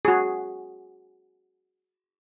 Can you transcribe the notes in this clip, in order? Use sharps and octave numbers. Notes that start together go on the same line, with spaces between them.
F#4 G#4